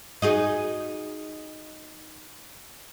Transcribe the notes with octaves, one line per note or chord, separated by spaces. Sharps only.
D#4 F#4 G#4